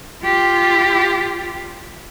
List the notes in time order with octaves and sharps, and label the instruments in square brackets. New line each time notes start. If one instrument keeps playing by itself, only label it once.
[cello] F4 G4